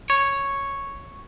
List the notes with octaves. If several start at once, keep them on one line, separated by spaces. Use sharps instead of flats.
C#5